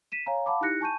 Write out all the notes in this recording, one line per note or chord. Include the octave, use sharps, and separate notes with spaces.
B6 D#7 E7
C#5 F5 G#5 A#5
F5 F#5 A5 B5 D6
D#4 E4 G4 F#6 A#6 C#7
G#5 A5 C#6 G6 D#7